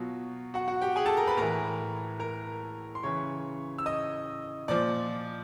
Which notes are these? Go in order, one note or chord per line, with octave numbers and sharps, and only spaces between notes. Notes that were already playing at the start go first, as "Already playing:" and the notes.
Already playing: B2 F#3 F4
F#4 F#5
F#4 F#5
G4 G5
G#4 G#5
A4 A5
A#4 A#5
B4 B5
A2 E3 A#4 A#5
A#4 A#5
C6
C#3 E3 C#5 C#6
E6
D#5 D#6
A#2 F3 D5 D6